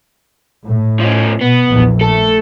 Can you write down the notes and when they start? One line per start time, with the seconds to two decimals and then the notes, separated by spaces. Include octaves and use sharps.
0.65 A2
1.00 F3 C#4
1.41 B2 B3
1.70 A#1 E2
2.01 A3 A4